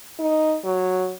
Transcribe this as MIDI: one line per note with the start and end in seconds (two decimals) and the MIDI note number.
0.20 0.56 63
0.65 1.12 54